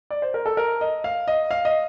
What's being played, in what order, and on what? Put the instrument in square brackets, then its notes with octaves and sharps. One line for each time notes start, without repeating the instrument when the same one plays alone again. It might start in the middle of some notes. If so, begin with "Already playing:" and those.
[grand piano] D5
C5
A#4
A4
A#4
D#5
F5
D#5
F5
D#5